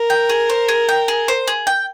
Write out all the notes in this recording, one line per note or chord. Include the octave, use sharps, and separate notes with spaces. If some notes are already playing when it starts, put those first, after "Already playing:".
Already playing: A#4
G5
G#4
C5
G#4
G5
G#4
C5
G#4
G5